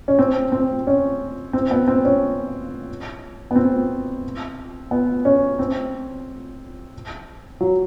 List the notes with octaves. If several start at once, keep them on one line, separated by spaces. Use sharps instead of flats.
C#4
C4
C4
C#4
C4
B3
C4
C#4
B3
C4
B3
C#4
C4
F#3